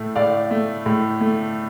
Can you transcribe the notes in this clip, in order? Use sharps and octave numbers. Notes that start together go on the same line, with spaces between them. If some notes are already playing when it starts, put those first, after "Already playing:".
Already playing: A2 A3
A2 D5 F5
A3
A2
A3